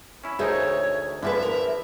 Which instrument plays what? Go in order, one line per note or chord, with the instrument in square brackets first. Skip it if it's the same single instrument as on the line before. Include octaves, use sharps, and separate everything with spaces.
[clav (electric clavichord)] C#4 E4
[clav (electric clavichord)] D2 D#4 A#4 [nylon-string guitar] G#4 C5 E5 [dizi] C#5
[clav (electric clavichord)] D3 F3 [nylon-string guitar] E4 G#4 B4 [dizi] E5
[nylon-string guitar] A#4